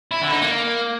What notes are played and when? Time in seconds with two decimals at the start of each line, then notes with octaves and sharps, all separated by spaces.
0.11 E4
0.22 D3
0.32 D#4
0.42 A#3